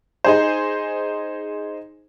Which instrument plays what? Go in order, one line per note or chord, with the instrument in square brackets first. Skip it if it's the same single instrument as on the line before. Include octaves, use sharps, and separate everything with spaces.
[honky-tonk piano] D#4 G#4 C5